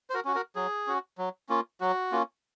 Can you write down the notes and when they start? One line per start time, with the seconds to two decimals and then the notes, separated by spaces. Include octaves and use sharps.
0.10 C5
0.14 F#4 A#4
0.25 C#4 F#4
0.35 F#4 A#4
0.56 F#3 G#4
0.87 C#4 F#4
1.18 F#3
1.49 A#3 C#4 F4
1.81 F#3 F#4
2.12 A#3 C#4 F4